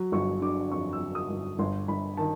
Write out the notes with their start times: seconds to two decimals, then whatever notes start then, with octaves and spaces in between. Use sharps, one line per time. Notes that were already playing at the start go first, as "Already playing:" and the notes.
Already playing: F#3
0.12 G1 C#6
0.41 D3 D6
0.72 F2 C#6
0.93 E6
1.00 F#3
1.15 D#6
1.30 G1
1.59 G1 C6
1.88 G1 B5
2.17 D#3 A5